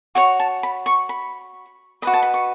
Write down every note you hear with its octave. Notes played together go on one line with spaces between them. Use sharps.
F#4 C#5 C#6
A5
B5
C#6
B5
F#4 B4 D#5 B5
A5
B5
C#6